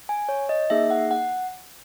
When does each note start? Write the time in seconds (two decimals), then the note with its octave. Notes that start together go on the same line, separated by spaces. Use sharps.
0.09 G#5
0.29 C#5
0.49 D#5
0.70 A#3 D#4 G#4 E5
0.91 F#5
1.11 F#5